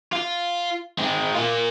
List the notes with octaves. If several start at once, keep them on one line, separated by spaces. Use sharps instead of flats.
F4
G#3 C4
A#3 F4